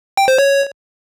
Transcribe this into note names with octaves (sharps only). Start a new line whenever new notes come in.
G5
C5
C#5